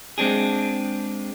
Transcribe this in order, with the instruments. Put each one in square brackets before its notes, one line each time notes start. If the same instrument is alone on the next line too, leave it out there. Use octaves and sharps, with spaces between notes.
[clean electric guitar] G#3 C4 D4 G#4